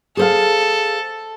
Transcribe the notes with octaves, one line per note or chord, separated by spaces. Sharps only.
G#4 A4 C5 F5